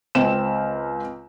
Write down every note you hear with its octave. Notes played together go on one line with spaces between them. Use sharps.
C#2 C4 E7